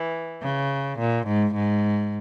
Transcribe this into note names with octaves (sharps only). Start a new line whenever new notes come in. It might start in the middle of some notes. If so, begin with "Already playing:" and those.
Already playing: E3
C#3
A#2
G#2
G#2